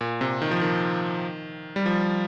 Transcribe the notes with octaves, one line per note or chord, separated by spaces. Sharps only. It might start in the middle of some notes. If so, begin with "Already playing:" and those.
A#2
C3
D#3
F3
D#3
G3
F3